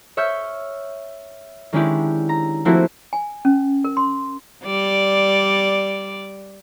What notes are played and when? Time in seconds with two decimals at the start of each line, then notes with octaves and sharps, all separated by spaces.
0.17 C#5 E5 C#6 E6 F6 G6
1.73 D#3 G#3 C#4 D4 E4 G4
2.29 A#5
2.65 F3 A3 A#3 C4 E4 F#4
3.13 G#5
3.45 C#4
3.84 A#4
3.97 C6
4.64 G3 D5